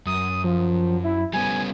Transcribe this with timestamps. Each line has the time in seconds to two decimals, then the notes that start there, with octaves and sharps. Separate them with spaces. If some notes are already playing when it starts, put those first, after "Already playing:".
0.06 F#2 D#6
0.44 F3
1.04 E4
1.33 G3 B3 C#4 G#5